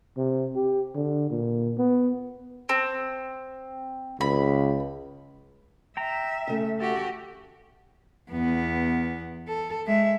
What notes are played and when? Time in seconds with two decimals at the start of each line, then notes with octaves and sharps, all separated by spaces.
0.17 C3
0.55 G4
0.95 D3
1.30 A#2
1.78 B3
2.69 C4
4.21 C#2 B5
5.97 E5 G5 A#5
6.47 C#3 A3
6.80 F#4 G4 A4
8.31 E2 B3
9.48 A4
9.86 G#3 E5